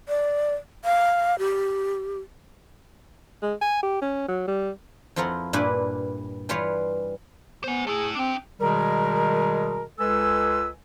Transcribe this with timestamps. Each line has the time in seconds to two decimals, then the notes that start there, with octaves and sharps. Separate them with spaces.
0.08 D5
0.84 F5
1.39 G4
3.42 G#3
3.61 G#5
3.83 G4
4.02 C#4
4.28 F#3
4.47 G3
5.16 F2 F3 E4 F4 A#4 F#5
5.53 G2 A#2 E4 B4 D5 G#5
6.49 E3 G3 F4 B4 C#5
7.64 B3 C5 G#5
7.87 A3 E4 G#4
8.15 C4 D4 G5
8.60 B2 D#3 G3 G#3 G#4 A#4
9.99 C#2 G#3 A4 B4 G#5 E6